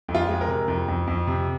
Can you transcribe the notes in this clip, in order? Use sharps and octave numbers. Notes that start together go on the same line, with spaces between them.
F2
F4
G#3
A#4
C3
F2
F2
F2
C3